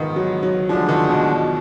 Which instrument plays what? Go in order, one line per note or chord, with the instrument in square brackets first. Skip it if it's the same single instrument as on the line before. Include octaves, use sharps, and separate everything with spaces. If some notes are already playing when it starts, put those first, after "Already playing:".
Already playing: [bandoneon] G#2 F3 B3 [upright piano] D#3
[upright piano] F#3
F#3
[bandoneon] D2 D3 G#3 D4 [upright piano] F3
[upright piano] D#3
B2